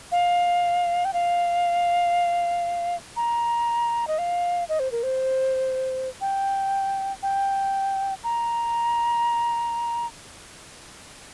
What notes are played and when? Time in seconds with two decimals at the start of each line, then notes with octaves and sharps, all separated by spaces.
0.12 F5
1.05 G5
1.13 F5
3.16 A#5
4.08 D#5
4.18 F5
4.69 D#5
4.80 C5
4.92 A#4
5.03 C5
6.21 G5
7.23 G5
8.24 A#5